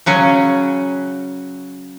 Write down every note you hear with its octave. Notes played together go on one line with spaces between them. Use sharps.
C#3 F#3 C#4